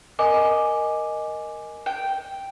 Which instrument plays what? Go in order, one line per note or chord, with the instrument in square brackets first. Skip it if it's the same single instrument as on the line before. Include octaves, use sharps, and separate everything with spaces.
[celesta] A#4 G#5 D6 [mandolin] D#5
[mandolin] G5